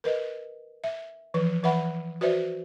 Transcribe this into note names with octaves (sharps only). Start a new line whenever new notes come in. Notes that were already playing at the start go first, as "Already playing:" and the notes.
A#4 B4 D#5
E5
E3 F3 B4
E3 B4 E5 F#5 B5
F#4 B4 C5 D5 E5